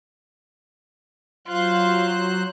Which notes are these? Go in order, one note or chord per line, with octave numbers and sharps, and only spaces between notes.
F#3 F4 C5 F#6